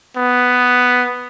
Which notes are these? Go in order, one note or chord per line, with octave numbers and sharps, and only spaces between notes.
B3